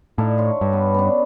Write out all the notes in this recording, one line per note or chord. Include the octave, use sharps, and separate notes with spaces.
A2 D4 D#4 F5
C#5 E5 C6
G2
B3 B4
B3 C#4 D4